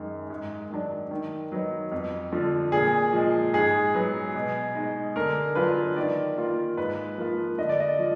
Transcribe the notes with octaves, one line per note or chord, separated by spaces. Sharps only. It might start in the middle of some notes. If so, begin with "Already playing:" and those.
Already playing: F#2 D#3 G#3
G#2
D#3 F#3 D4
D#3
F#3 B3 D#4
F2
D3 F3
A#2 G#4
F3 G#3
G#2 G#4
F#3 B3
B2
G#3 D#4
D3 A#4
F#3 B3 D4 F4 B4
D#3 D5
A#3 F4
G#2 B4
F3 A#3 F4
D3 D#5
D5
D#5
F3